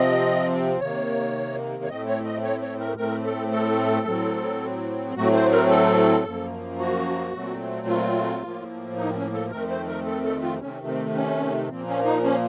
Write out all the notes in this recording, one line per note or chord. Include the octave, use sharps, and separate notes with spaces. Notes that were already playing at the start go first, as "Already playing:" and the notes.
Already playing: C3 F3 C4 D#5
C3 D#3 A#3 C#5
C#5
A2 A3 C4 D#5
C#5
D#5
C#5
C#5
A#4
A2 A3 C4 A#4
A4
A4
A2 F#3 C4
A2 F#3 A3 C4 F#4
C5
A#4
A4
F#2 F3 A#3
F#4
A#2 F#3 A3 C4
F4
A2 F3 A#3
D#4
C4
C#4
A4
F2 D#3 A3 C4 A#4
C5
A#4
A4
A4
F4
C3 D#3 A3 C4 C#4
C4
C#4
A#2 F3 A#3 C4
C#4
D#4
C#4